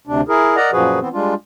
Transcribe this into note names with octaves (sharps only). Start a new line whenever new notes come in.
D2 C3 D4
E4 G#4 A#4
A#4 D5 D#5 F#5 A#5
F#2 A#2 F3 F#4 G#4 B4
E3 B3 C4
G3 G#3 D4 F4